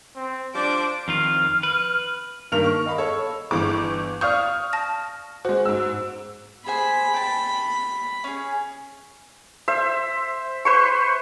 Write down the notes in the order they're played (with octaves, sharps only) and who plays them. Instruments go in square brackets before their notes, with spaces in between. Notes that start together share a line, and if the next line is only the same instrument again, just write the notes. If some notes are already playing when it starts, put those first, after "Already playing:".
[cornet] C4
[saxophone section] F3 G3 D4 [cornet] C5 [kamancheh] D6
[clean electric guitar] F2 D#3 F4 [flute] F6
[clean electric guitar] B4
[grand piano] G2 D#3 A#3 A#4 F6 F7
C#6
D#5 F5 B5
A4 C#5 E6
[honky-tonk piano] G1 E3 D6
[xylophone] D5 F5 G6 [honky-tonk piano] C#6 D#6 F6
[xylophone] A5 A#6
[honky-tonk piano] G#3 F#4 [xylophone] C5
[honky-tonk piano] G#2 E6
[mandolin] G#4 C5 G#5 [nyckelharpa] B5
[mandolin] G5 A5
C#4 G#4
[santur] C5 E5
B4 C5 C#6